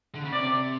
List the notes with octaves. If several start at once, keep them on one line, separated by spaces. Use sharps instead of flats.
D3
C#3
C3 D5